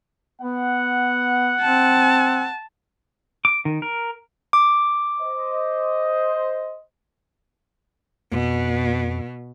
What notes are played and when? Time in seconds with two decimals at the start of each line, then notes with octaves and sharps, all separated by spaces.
0.42 B3 F#5
1.62 C4 A5
3.45 D6
3.65 D#3
3.82 A#4
4.53 D6
5.20 C5 D#5
8.32 F2 B2